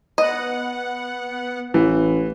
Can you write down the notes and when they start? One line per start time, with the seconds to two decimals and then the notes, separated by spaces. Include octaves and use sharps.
0.18 B3 D#5 F#5
1.74 A1 E3